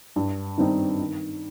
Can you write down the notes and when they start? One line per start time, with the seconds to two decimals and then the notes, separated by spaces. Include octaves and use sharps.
0.16 G2
0.58 D#3 G3 C4 D#4
0.99 D#3